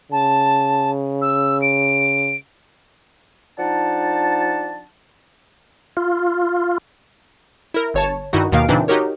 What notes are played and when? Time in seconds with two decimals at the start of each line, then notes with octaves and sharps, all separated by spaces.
0.12 C#3 A5
1.22 E6
1.62 D7
3.59 F3 D4 D#4 F#5 A5
5.97 F4
7.74 E4 A#4
7.94 G1 C#5 A5
8.33 G2 D#3 D#4 E4 F#4
8.52 D#2 B2 D#3 A#3 F5 D7
8.69 A#2 C#3 E3 C4 D4 D#4
8.88 D#4 F#4 G4 A#4 C#5